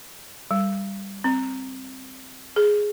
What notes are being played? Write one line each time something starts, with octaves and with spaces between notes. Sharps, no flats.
G3
C4
G#4